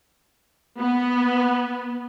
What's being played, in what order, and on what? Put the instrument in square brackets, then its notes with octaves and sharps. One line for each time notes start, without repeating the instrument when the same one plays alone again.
[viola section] B3